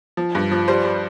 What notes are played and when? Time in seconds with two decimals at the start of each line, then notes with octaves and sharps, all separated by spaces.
0.17 F3
0.35 G2
0.51 F3
0.68 G3 C5
0.85 G3